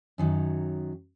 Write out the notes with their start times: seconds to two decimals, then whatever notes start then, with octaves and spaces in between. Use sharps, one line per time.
0.18 F#2 D#3 F#3